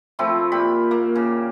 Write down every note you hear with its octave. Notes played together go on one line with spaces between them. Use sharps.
F3 A3 C4 E4
A#2 G4 B5
A#3
C#3